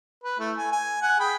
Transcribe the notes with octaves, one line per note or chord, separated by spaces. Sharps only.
B4
A3 E4
G#5
G#5
F#5 G#5
G#4 G5 B5